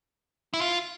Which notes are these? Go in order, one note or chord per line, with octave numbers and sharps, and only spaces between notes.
E4
F4